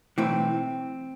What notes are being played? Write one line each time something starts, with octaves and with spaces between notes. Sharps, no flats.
B1 A2 E3 C4